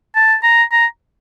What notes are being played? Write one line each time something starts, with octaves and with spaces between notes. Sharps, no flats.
A5
A#5
A#5